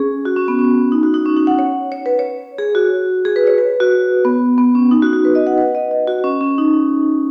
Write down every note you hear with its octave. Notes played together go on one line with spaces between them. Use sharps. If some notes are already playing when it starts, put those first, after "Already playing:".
Already playing: C#4 G#4
F#4
C#4
B3
C#4
D#4
F#4
D#4
C#4
D#4
F#5
C#5
C#5
B4
C#5
G#4
F#4
G#4
B4
C#5
B4
F#4
B3
B3
C#4
D#4
F#4
F#4
B4
D#5
F#5
B4
D#5
D#5
F#4
C#4
C#4
D#4